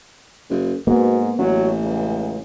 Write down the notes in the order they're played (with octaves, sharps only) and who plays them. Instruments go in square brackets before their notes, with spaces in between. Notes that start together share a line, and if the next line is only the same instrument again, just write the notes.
[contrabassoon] F#1
[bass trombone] G#2 [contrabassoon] B2 [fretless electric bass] A#3 B3
[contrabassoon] A1 [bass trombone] F#3
[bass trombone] C#2